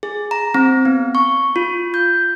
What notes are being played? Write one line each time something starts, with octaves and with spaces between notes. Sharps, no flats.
G#4
A#5
C4
B3
C#6
F4
G6